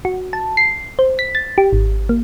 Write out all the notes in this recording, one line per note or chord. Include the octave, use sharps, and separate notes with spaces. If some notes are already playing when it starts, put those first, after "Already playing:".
F#4
A5
C7
C5
B6
A6
G4
G#1
A#3